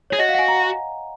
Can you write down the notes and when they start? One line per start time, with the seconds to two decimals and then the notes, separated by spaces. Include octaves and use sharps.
0.10 G#4 C#5
0.19 F#4 D#5
0.29 F5
0.34 F#5
0.39 G#5
0.48 A#5